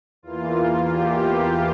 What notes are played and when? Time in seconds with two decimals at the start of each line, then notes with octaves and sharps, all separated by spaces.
0.23 E2 E3 A#3 F4
0.91 G4